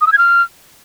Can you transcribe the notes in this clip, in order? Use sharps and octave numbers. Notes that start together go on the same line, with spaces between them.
D#6
E6
G#6
F6